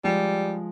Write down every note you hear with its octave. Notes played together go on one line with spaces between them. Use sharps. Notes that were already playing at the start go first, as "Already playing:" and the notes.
F3 G3 G#3